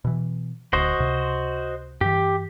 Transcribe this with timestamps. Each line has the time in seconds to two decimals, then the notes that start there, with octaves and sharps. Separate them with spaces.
0.05 B2 E3
0.73 D1 D2 F#4 C5 D#5
0.99 C#2 C3
2.01 G2 E3 G4